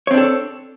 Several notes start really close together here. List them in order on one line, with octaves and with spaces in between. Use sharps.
C#5 C4 D4 A4